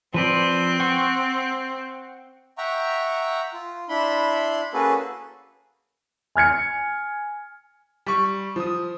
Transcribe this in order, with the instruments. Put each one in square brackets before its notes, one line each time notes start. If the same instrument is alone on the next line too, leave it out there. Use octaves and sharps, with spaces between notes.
[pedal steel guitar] F3 B4 D5 [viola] C4
[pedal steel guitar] F#5 G5 C#6
[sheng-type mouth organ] E5 F#5 G5 A#5 C#6
F4
D4 E4 B5 C6
A#3 C#4 F#4 G#4 A4 B4
[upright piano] G#5 F6 G#6 C#7
[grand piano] G3 C#6
F3 D#6